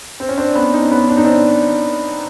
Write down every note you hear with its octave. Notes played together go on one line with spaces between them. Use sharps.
C4
C#4
C4 D4
B3 C#4
C#4 D#4
B3 C#4
D4
D#4
C4 D4